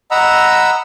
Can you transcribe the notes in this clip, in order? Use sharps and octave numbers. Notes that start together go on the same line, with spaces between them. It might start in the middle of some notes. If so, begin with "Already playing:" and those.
D#5 F#5 A#5 B5 E6